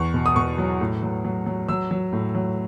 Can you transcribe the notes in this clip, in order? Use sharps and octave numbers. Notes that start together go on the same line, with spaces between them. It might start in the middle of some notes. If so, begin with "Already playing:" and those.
Already playing: E2 C#6
B2
D#6
B2 C#6
F#3
A2
F#3
F#3
F#3
F#3 E6
F#3
A2
F#3